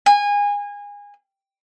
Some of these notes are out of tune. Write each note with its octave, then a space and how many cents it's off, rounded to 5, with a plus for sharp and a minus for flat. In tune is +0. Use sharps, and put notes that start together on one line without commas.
G#5 -25